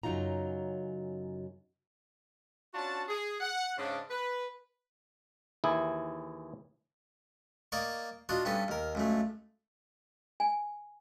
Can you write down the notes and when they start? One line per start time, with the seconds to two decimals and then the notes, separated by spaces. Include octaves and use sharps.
0.03 F#2 C#3 F#3 D#4 F4 A#5
2.74 C#4 D4 F4 F#4 A5
3.08 G#4
3.40 F#5
3.78 G#2 C#3 D4
4.11 B4
5.64 D#2 E3 E4 G#4
7.72 A#3 D5 D#5 C#6
8.29 D4 F4 F#4 D#5
8.45 G2 B3 C#4 A4
8.68 D#2 A#4
8.95 C#2 F#2 A3
10.40 G#5